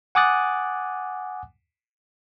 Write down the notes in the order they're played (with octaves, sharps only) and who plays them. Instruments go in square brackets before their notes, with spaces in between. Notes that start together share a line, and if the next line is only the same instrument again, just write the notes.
[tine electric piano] F#5 G#5 D6 D#6 F#6 A6